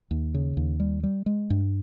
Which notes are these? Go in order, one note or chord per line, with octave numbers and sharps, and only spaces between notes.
D#2
C#3
D#2
G3
G3
G#3
G2